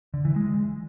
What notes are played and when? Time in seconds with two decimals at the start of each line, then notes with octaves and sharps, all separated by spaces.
0.14 D3
0.25 E3
0.36 G#3